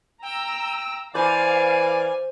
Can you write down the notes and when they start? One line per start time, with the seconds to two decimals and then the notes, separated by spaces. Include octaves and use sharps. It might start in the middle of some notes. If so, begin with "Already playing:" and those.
0.22 G5 A#5 E6
1.15 E3 B4 C5 D5 F5 G#5